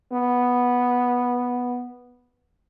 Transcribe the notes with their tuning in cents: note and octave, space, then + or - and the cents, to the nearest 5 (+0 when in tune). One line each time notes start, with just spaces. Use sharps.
B3 -5